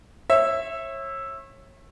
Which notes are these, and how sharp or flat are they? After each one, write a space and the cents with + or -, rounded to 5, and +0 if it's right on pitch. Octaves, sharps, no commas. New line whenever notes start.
C#5 -30 E5 +0